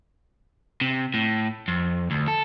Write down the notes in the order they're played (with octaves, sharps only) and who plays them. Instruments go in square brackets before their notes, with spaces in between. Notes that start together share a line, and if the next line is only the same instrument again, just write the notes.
[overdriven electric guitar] C3
A2
F2
D2
A4